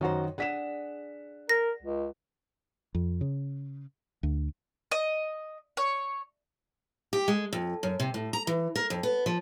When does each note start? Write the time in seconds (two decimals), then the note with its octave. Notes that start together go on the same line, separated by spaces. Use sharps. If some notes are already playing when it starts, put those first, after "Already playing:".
0.01 F#2 D#3 F#4 C5 A#5
0.38 D4 G#4 F#5 B6 E7
1.49 A#4 A#6
1.82 C#2
2.95 F2
3.21 C#3
4.23 D2
4.92 D#5
5.77 C#5
7.13 G4
7.28 G#3
7.53 F2
7.83 F#2
8.00 C3
8.14 A2
8.33 A#5
8.47 E3
8.76 A#4
8.90 F2
9.03 B3
9.26 F3